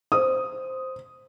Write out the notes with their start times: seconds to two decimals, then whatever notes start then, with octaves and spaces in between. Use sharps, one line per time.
0.12 C5 D#6